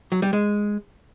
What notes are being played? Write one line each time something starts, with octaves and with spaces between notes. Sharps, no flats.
F#3
G3
G#3